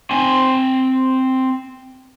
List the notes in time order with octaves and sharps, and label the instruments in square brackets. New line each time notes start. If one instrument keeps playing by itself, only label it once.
[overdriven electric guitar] C4 G#5